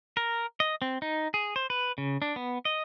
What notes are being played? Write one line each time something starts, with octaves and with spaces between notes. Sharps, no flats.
A#4
D#5
C4
D#4
G#4
C5
B4
C#3
D4
B3
D#5